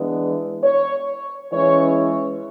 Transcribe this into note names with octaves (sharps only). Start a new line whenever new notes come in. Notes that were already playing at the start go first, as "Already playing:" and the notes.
Already playing: E3 G#3 B3 D4
C#5
E3 G#3 C#4 C#5